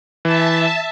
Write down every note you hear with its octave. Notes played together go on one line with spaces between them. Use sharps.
E3 E5 A5